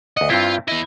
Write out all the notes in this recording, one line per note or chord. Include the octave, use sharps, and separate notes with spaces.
D2 D#5 F#5
G2 C4 E4 F4
B3 E4 D#5